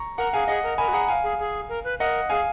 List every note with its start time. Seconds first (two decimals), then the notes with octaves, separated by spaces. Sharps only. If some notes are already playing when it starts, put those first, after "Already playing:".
Already playing: A#5 C#6
0.18 A#4 F#5 A#5
0.33 G#4 F5 G#5
0.48 G#4 D#5 F#5
0.63 A#4
0.78 A#4 G#5 B5
0.88 F#4
0.93 G#4 F#5 A#5
1.08 F5 G#5
1.24 G#4
1.40 G#4
1.69 A#4
1.84 B4
1.99 A#4 D#5 F#5
2.29 G#4 F5 G#5